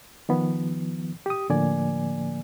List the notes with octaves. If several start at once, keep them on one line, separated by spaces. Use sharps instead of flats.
D#3 F3 B3
G4 D#6
A2 D3 F3 A#3 D5 G#5